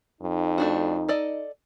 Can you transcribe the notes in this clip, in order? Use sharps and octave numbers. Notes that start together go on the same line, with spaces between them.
F2 D#4
A3 D4 F#4
A4 D5 D#5